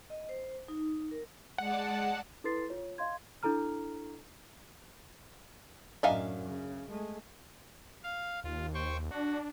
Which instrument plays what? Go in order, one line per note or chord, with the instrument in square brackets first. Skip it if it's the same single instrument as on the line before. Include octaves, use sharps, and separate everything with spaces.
[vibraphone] D#5
C5
D#4
A#4
[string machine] G#3 D5 A5 [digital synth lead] F#5
[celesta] E4 A4 B4 C6 A6 C7
F4 C#5
D#5 F5 C6 G#6
D4 E4 A4 A#5 F6
[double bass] F#2 A2 [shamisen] D4 D#4 G#5 [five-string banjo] E5 F5
[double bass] C#3
G#3 A3
[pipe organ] F5
[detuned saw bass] D#2 [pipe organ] F4
[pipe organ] C5 G5 C#6
[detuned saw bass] D4 [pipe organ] F#4